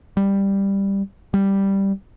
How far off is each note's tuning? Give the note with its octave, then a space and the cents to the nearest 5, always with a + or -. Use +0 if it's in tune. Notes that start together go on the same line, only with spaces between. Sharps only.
G3 +10
G3 +0